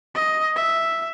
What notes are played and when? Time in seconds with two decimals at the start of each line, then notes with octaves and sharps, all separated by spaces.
0.15 D#5
0.55 E5